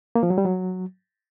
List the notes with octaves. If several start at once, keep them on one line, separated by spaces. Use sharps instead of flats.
A#3
F3
F#3
G3
F#3